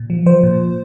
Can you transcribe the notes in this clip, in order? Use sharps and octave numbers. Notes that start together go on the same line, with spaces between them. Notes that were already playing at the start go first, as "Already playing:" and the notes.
Already playing: A#2
F3
F3 C5
A#2